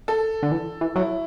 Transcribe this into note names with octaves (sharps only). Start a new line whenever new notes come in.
A4
D3
E3
E3
F#3 E4